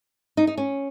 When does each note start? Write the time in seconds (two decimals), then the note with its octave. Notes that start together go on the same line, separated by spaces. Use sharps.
0.37 D#4
0.47 D#4
0.58 C#4